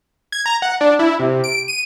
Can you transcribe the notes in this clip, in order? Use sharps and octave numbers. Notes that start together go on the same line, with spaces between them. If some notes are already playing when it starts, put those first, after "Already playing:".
G#6
A#5
F#5
D4
E4
C3
D7
D#7